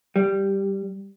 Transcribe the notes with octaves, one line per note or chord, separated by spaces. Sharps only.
G3